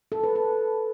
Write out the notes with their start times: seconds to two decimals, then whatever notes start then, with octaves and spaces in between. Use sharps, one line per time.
0.12 A4
0.24 B4
0.36 B4